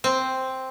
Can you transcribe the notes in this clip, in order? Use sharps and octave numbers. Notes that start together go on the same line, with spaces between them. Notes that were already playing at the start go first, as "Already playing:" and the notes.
C4